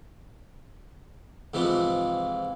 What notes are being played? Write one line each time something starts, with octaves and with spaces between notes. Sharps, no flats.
G#2 C3 E3 F3